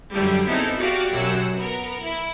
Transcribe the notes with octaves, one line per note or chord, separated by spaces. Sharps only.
F#2 D3 G3
B3 C4 D#4 E4 G#4 A4
F#4 G4 D5 F5
B1 F#2 F#3 F#5 E6
B3 A#4
E4